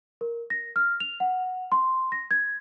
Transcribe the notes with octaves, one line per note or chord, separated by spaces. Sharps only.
A#4
A#6
F6
F7
F#5
C6
A#6
G#6